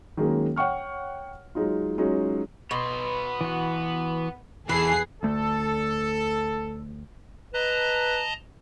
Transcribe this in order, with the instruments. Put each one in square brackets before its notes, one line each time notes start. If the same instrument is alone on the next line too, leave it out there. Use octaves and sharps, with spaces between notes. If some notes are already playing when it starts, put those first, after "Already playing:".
[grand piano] D#3 F#3 G#3 A#3 C#4 G#4
C#5 F#5 G5 C#6 F6
F#3 G#3 D#4 F4
F#3 G#3 C#4 D#4 F4
[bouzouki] B2 [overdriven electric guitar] B3 C6
[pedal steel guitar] E3 F#4
[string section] E2 G#4 C7 [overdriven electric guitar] B2 A4 [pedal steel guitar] E3 [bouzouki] B4
[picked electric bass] D2 A3 [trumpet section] A4
[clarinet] B4 [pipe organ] D#5 A5 A#5